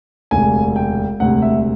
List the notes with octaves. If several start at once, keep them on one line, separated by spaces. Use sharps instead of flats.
E1 D2 C3 G#5
G5
E1 D2 C3 F#5
E5